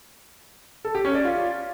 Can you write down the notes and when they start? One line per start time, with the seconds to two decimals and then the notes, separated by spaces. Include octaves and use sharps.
0.85 A4
0.95 G4
1.05 C#4
1.15 D5
1.25 F4